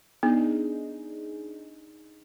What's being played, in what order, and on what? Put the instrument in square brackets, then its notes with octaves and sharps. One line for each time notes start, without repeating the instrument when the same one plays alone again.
[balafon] B3 [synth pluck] D4 D#4 G#4